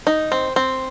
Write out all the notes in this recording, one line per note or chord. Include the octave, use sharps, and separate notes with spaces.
D#4
C4
C4